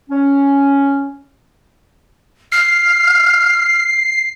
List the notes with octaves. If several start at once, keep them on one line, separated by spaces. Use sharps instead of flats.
C#4
F6 C7